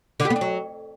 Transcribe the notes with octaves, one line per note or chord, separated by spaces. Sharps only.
D3
G4
B3
D4
F#3